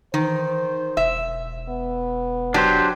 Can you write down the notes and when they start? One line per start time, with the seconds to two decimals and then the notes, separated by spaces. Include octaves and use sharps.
0.14 D#3 E3 C5
0.97 E1 E5
1.69 B3
2.54 F#3 D4 G4 C5